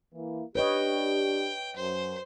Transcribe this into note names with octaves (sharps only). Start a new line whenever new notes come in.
E3 A#3 E4
D4 G4 B4 C#5 D#5 G5
F#2 C5